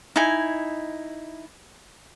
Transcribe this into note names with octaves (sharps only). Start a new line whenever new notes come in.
D#4 E4 G#5